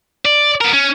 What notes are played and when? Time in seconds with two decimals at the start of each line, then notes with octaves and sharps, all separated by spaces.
0.25 D5
0.61 B3 A#4
0.73 C#4